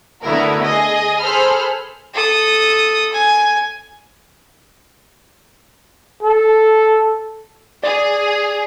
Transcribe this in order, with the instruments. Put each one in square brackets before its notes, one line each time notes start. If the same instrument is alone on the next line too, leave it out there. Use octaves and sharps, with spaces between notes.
[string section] D3 A3 B3 E4 F#4 A#4
G#4 D#5
G#4 A4 C5 B5 F6
[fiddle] A4 D#6
G#5
[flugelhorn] A4
[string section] G#4 [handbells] D5